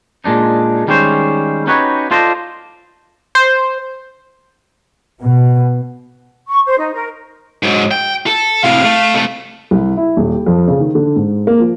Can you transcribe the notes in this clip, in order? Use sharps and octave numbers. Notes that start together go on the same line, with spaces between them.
A#2 G#3 D4 D#4
D#3 G3 G#3 C#4 C5
C#4 D#4 F#4 G4 B4 C#5
F4 A4 C5 D5 D#5
C5
B2
C#6
C5
D#4
A#4
G#2 F#3
G5
A4
A2 C3 F5
A3
C3 A3
C2
E4
D#1
G4
F2
C#3
D#3
D3
G#2
A#3
F3